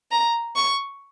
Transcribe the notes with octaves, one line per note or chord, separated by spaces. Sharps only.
A#5
C#6